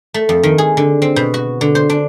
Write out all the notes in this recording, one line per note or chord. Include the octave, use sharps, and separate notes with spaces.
A3
F2
D#3
G#4
D3
C4
B2
F#4
D3
C5
D4